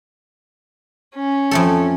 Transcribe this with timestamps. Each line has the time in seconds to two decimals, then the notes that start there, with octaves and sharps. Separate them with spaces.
1.16 C#4
1.51 F2 A3 A4